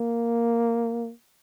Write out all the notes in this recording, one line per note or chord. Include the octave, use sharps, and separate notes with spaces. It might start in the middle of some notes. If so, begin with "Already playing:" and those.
Already playing: A#3